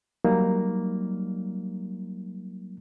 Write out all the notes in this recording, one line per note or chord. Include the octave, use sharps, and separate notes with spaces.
F#3 G3 A#3 D#4